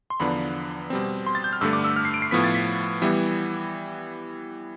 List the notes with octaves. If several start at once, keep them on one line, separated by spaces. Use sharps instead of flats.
C6
E2 D3 F3 B3 D4 B5
B2 G3 C4
C6
A6
G6
F6
G2 D3 A3 E6
D6
E6
F6
C7
D7
C7
A2 F3 B3 B6
A6
B6
E3 G3 B3 E4